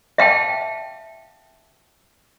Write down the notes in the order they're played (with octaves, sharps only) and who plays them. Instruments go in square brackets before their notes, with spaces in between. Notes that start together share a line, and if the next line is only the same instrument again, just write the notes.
[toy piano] E5 F5 G5 A5